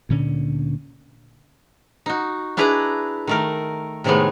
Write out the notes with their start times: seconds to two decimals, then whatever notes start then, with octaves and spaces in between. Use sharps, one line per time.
0.09 D2 A#2 D3 C#4
2.06 D#4 F#4
2.57 D4 E4 G#4 B4 A#5
3.27 D#3 A3 A#4
4.04 A2 C3 D#3 G#3 A3 B3